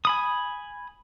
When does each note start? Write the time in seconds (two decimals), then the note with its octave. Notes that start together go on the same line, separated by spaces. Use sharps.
0.05 G#5 B5 D#6